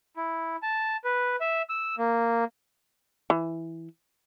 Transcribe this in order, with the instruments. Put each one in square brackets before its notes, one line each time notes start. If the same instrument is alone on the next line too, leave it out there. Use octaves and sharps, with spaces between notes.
[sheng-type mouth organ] E4
A5
B4
E5
E6
A#3
[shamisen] E3